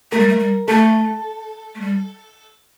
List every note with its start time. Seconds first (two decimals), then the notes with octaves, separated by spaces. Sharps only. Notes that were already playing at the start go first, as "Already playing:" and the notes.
0.12 A3 A#4
0.20 G3
0.28 A3
0.40 G3
0.68 A3 A4
1.75 A3
1.81 G3